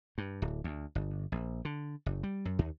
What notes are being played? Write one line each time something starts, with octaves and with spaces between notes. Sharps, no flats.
G2
D1
D2
G1
A#1
D3
F#1
G3
F#2
D#2